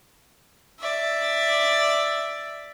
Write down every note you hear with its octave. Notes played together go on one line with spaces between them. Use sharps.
D5 E5